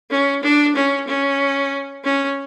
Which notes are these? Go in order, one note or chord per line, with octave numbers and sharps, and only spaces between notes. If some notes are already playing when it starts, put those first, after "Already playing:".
C#4
D4
C#4
C#4
C#4